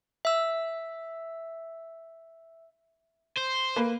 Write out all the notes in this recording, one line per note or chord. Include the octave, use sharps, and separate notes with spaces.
E5 E6
C5
A#3 B4